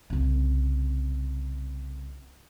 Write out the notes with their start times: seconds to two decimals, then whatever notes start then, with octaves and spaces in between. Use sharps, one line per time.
0.10 C2 C#3